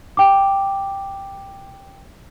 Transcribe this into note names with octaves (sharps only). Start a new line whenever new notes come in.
G5 D6